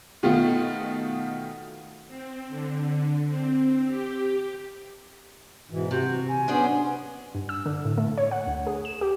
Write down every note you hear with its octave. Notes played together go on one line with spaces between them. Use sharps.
B2 D#3 A3 B3 F4
C4
D3
C4
G4
G#2 B2 E3
C3 F#4 G6
G#5
B3 C#4 D4 G#4 C5 D5
G2
E6
D3
A2
A3
C#5
F#5
D2
G#4
E7
G4